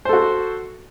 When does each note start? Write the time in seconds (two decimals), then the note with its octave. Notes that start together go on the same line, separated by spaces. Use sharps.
0.05 C5
0.09 A4
0.13 F#4